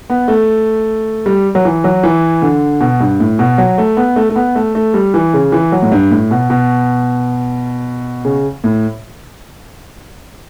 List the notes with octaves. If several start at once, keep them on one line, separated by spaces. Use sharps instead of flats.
B3
A3
G3
F#3
E3
F#3
E3
D3
B2
G2
A2
B2
F#3
A3
B3
A3
A3
B3
A3
A3
G3
E3
C#3
E3
F#3
A2
G2
A2
B2
B2
C#3
A2